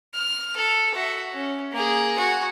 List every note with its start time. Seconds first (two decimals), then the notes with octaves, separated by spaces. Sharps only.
0.14 F6
0.56 A4
0.95 F#4 E5
1.33 C#4
1.72 A#3 G#4
2.18 F#4 G#5